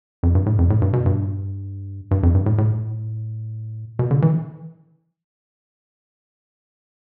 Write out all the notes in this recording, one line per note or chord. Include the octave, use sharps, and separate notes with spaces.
F2
G2
A2
F2
A2
G2
B2
G2
G2
F2
G2
A2
A2
B2
D3
E3